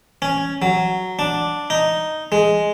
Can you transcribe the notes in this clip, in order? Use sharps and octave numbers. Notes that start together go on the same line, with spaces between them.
C#4
F#3
D4
D#4
G#3